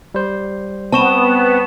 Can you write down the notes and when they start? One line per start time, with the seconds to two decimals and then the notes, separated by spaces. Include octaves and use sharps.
0.14 G3 C5
0.92 B3 C4 A5 C#6 E7